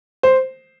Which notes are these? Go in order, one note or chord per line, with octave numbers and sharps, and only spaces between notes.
C5